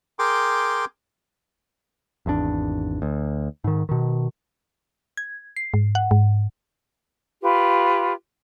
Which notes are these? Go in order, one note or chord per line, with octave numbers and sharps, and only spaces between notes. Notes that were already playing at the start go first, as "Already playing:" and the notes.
G#4 A#4 G5 C6 D6
G#1 E2 C#3 D4
D2
G#2 D#3
B2 D#3
G#6
C7
G#2
F#5
G#2
F4 G4 B4